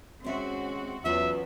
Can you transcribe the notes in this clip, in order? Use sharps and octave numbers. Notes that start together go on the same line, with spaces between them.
D#2 G#3 C4 C#4 F#4 E5
E2 F#3 B3 C#4 F4 B4 E5